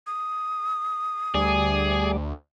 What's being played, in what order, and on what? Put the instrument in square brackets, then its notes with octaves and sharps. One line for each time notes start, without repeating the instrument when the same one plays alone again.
[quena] D#6
[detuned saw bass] D2 [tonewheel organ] G3 D5 [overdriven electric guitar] G#4